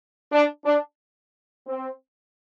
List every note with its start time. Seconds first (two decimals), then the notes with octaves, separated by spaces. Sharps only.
0.32 D4
0.65 D4
1.67 C4